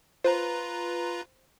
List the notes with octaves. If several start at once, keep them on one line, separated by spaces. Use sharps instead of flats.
F4 B4 C5 A#5